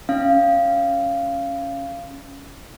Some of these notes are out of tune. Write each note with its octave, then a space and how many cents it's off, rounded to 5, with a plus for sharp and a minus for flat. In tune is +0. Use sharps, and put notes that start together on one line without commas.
C#4 +0 F5 -20